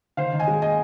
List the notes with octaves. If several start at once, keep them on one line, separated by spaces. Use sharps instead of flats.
D#3 C5 F5
D#3
D#5 G#5
G#3
D#5 G#5